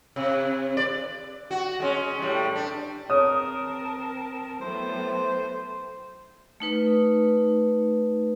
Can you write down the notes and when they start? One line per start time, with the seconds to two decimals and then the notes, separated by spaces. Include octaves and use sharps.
0.16 C3
0.77 D5
1.51 F#4
1.80 G#3 C#4
2.19 A2 G3
2.56 D4
3.10 C4 G#4 A#4 B4 C#5 A5 D#6
4.61 A2 F#3 B3 C5
6.60 A3 D#4 B4